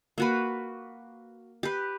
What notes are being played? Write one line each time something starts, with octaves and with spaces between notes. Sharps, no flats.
A#3 F#4 B4
G4 B4